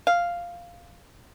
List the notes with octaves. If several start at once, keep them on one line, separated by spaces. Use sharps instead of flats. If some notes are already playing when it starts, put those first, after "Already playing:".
F5